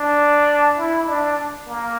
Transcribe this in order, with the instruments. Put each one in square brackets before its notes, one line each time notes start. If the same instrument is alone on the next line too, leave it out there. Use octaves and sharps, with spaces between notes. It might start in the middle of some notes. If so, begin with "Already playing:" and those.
Already playing: [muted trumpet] D4
E4
D4
A#3